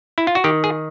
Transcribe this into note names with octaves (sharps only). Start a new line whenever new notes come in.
E4
F4
F#4
D#3 G4
G#4